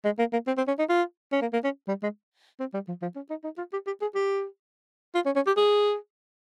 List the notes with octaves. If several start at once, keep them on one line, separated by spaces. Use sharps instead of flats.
G#3
A#3
A#3
C4
C4
C#4
D#4
F4
C#4
A#3
A#3
C#4
G3
G#3
C4
G3
F3
F3
C#4
D#4
D#4
F4
G4
G4
G#4
G4
F4
C#4
C#4
G4
G#4